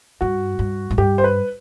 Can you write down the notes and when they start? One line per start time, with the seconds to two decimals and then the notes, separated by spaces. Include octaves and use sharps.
0.21 G2 F#4
0.59 G2
0.91 G#2
0.98 G2 G4
1.18 C5
1.24 B4